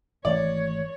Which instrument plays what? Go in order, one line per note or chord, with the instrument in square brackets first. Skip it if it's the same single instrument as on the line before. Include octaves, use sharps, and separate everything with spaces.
[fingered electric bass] G#1 E3 A3 [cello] C#5 [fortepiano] D5